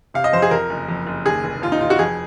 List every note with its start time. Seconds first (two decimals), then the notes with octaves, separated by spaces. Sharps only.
0.14 C3 F5
0.24 D#5
0.33 F2 C5
0.42 G#4
0.51 F2 A#4
0.70 F#1
0.88 F2
1.07 F#1
1.25 D#2 G#4
1.44 F1
1.62 D#2 F4
1.72 D#4
1.81 F1 F4
1.90 F#4
1.99 F2 G#4